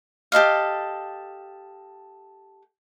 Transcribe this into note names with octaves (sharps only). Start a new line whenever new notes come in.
G4 A4 D#5 F5